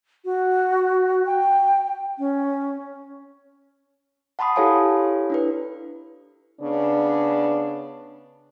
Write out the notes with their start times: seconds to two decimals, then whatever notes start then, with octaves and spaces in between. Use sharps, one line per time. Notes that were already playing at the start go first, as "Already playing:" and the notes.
0.25 F#4
1.26 G5
2.19 C#4
4.39 F#5 A5 B5 C6 D#6
4.56 E4 G4 A4 C#5 F5 G#5
5.30 D4 E4 B4
6.61 C#3 B3 D4